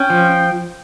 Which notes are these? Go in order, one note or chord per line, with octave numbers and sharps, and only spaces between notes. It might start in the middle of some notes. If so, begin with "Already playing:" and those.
Already playing: C#4 G5
F3